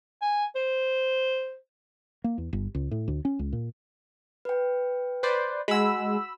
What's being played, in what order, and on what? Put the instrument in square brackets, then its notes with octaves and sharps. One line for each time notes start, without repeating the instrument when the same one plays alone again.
[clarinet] G#5
C5
[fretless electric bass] A#3
E2
G1
C#2
A2
D2
C#4
C#2
A#2
[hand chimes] B4 G5
[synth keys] B4 C5 D5
[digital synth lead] G#3 [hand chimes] F#4 F#5 [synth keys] B5 E6